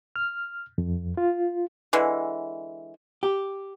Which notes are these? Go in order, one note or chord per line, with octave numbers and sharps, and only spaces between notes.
F6
F2
F4
D3 E3 G#3
G4